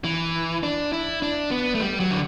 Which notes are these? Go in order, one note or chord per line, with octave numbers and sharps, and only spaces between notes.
E3
D4
E4
D4
B3
A3
G3
F#3
D3